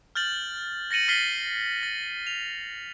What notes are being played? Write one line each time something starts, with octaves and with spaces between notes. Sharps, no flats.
F6 G6 A6 F#7
A6 A#6 C#7 D#7 F#7
F6 A6 B6 C7 D#7 G7
A6
F7